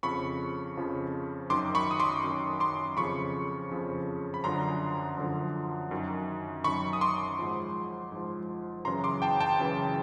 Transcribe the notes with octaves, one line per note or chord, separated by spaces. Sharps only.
F2 C#3 F3 B5 C#6
F2 C#3 F3
F#2 D#3 C6 D6
B5 C#6
D#6
C6 D6
F#2 D#3
C6 D6
F2 C#3 F3 B5 C#6
F2 C#3 F3
B5
F#2 D3 F3 A#5 C6
F#2 D3 F3
F#2 D#3
F#2 D#3 B5 C#6
D#6
C6 D6
G#2 F3
G#2 F3
F#2 C#3 E3 A#5 C6
C6 D6
G5 A5
G5 A5
F#2 C#3 E3